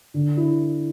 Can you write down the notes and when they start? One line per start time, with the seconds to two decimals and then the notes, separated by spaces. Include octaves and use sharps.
0.14 D3
0.37 E4